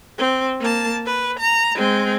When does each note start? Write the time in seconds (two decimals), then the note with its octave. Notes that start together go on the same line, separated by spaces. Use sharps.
0.18 C4
0.60 A#3 A5
1.06 B4
1.39 A#5
1.76 G#3 C4